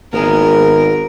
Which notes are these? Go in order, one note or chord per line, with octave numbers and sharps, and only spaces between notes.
G#1 A#3 B3 G#4 A#4